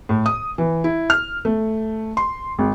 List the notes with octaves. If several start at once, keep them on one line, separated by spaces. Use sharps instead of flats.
A2
D#6
E3
E4
F6
A3
C6
G#1